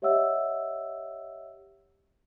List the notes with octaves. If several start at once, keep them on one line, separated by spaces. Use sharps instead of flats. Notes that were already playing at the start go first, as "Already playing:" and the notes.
G4 C#5 D#5 E5 F#5 E6